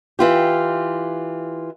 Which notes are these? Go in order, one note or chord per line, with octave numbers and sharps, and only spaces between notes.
E3 F4 G4